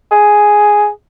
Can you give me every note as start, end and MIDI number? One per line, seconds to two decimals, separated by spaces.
0.11 0.88 68